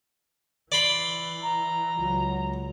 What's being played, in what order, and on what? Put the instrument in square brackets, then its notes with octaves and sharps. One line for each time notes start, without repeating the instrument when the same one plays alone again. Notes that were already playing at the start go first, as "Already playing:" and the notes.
[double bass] E3 [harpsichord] D5 B5 C6
[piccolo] A#5
[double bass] C#2 F#3